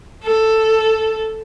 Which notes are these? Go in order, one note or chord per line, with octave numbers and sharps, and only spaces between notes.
A4